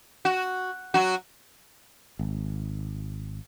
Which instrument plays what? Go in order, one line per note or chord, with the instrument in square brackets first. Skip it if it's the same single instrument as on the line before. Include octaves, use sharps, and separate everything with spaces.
[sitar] F#4
F#3 F#4
[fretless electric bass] G#1